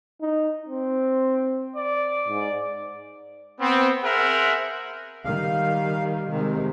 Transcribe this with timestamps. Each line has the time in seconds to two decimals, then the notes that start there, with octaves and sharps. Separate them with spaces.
0.22 D#4
0.69 C4
1.76 D5
2.28 G#2
3.60 B3 C4
4.03 G#4 A#4 C5 E5 F#5
5.25 D#3 G3 F5
6.30 C3 D#3 G#3